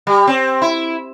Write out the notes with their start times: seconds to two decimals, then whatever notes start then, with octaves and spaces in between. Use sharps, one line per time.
0.07 G3
0.27 C4
0.62 E4